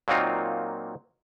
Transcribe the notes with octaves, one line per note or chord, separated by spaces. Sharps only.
A#2 F#3 A#3 C4 D#4 F4